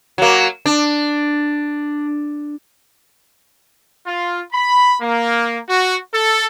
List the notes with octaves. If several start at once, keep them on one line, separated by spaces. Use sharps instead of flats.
F#3 A#3
D4
F4
B5
A#3
F#4
A4